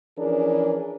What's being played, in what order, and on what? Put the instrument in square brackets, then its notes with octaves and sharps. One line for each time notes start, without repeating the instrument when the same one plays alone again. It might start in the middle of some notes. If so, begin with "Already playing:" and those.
[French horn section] E3 F3 C#4 D4 G#4 A#4